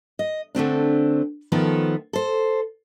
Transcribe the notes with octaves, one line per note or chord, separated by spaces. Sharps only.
D#5
D3 A3 C4 D4
D#3 F3 A3 B3 A4
A4 C5